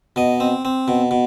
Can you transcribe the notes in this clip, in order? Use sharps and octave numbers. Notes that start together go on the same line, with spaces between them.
B2 D#5
C4
C4
B2
B2